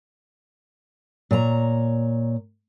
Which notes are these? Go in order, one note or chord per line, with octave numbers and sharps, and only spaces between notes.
A#2 C#5 A5 A#5